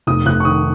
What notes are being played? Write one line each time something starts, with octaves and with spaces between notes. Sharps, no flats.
F1 D#6
F1 F#6
C#6
D#3 D#6